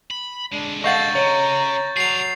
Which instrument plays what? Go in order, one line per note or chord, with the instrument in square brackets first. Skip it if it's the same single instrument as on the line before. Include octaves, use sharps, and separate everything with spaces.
[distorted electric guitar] B5
[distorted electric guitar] D3 G#3 [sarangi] D4
[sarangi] A4 [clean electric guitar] D#5 F5 F#5 [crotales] C#6 G6 A6
[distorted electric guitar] C#3 [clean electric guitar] C#5 [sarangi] A#5
[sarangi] F#3 [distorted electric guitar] D4 G#4 [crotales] C7 F7